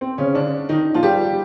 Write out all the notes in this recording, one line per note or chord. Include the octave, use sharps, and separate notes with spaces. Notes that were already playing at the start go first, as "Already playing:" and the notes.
C4
C#3 C#4
D3 D4
D#3 D#4
F3 F4
G3 G4